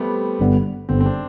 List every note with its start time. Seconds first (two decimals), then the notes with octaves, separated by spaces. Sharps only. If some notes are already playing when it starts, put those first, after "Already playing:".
Already playing: G3 A3 B3 C4
0.39 G1 G2 D3 G3 B3
0.89 G1 G2 D3 G3 B3 C4
1.00 C4
1.06 D4